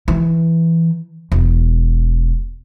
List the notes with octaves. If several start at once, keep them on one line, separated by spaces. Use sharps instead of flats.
E3
E1